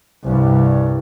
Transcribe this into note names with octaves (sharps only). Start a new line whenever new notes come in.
C2 G2